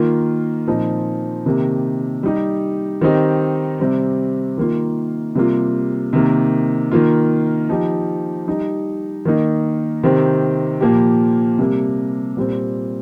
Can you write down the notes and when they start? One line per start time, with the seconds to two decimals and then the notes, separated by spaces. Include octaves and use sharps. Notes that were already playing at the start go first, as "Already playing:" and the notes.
Already playing: D#3 A#3 F4
0.67 A#2 F3 C4 D#4
1.46 C3 D#3 A#3 G4
2.23 G3 D#4 G4
3.01 D#3 C4 D#4 G4
3.80 C3 G3 C4
4.58 D#3 A#3 F4
5.35 C3 G3 A#3 F4
6.13 C3 D#3 A#3
6.91 D#3 A#3 F4
7.69 F3 D#4 G4
8.47 G3 D#4 G4
9.25 D#3 A#3 D#4
10.03 C3 D#3 C4 G4
10.81 A#2 F3 A#3 G4
11.59 C3 G3 A#3
12.37 A#2 G3 C4